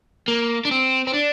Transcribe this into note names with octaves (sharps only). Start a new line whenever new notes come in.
A#3
D4
C4
C4
D4